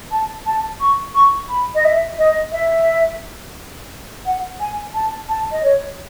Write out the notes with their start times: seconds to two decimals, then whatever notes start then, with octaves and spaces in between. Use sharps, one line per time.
0.11 A5
0.46 A5
0.80 C#6
1.15 C#6
1.49 B5
1.75 D#5
1.85 E5
2.18 D#5
2.52 E5
4.26 F#5
4.60 G#5
4.94 A5
5.29 A5
5.52 D#5
5.63 C#5